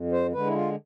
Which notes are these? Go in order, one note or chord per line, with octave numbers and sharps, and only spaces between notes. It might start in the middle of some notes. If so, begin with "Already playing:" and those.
Already playing: F2
C5
D3 G#3 B4
E4
F4